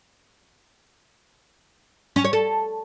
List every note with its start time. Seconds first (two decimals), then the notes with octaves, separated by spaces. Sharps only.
2.16 C#4
2.24 C#5
2.33 A4